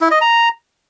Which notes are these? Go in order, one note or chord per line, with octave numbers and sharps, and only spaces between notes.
E4
D#5
A#5